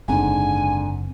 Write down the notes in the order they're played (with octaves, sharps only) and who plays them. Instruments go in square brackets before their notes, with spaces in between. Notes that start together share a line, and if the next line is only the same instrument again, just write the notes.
[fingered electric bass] F#1 C4 [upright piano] G#2 D3 [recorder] G#5